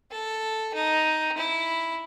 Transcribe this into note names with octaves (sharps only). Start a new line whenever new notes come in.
A4
D#4
E4